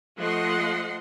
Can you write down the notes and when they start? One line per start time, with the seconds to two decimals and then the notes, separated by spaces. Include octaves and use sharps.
0.18 F3 A3 D#5 F#5 C6